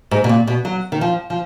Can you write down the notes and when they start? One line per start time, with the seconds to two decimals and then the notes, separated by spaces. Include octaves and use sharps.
0.11 G#2
0.24 B2
0.29 A#2
0.47 B2
0.65 F#3
0.92 D#3
1.01 F3
1.30 F3